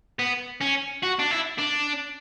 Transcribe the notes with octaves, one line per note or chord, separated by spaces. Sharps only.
B3
C#4
F#4
D4
E4
D4